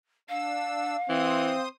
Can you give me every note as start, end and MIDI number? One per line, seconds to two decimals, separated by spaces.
0.29 0.96 62
0.29 1.61 77
0.29 0.96 88
1.09 1.52 52
1.09 1.68 60
1.09 1.68 72
1.09 1.68 87